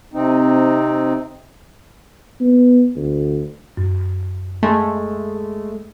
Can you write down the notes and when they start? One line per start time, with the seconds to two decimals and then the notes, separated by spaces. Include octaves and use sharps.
0.14 C3 C4 D#4
2.40 B3
2.96 D2
3.77 F#2
4.63 G#3 A3